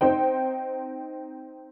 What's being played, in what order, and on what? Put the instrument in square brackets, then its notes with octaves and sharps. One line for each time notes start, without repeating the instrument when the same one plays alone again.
[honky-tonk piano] C4 D#4 C5 G5